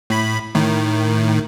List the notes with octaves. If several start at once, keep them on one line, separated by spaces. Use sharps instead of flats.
A2 B5
A2 D#3